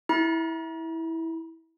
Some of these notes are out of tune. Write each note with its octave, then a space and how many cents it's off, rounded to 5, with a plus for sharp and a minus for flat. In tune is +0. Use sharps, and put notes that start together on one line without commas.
E4 -15 A#5 +45